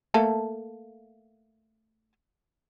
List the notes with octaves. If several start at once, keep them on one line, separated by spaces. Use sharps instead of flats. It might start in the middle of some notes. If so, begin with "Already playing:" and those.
A3 A#3 A4